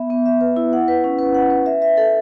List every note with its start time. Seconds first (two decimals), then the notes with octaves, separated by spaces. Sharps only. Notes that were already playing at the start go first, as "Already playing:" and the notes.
Already playing: B3 E5
0.10 B3
0.26 E5
0.41 B4
0.57 E4
0.73 F#5
0.88 B4
1.04 C#4
1.19 B4
1.35 F#5
1.50 B4
1.66 E5
1.82 E5
1.97 A4